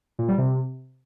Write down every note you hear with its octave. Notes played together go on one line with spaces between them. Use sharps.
A#2
G3
C3